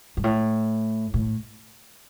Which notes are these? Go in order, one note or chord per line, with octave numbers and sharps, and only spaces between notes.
G2
A2
A2